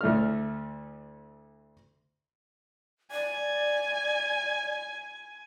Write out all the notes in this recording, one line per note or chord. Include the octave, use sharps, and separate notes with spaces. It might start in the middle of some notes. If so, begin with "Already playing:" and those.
D2 A3 E4 F6
D5 G#5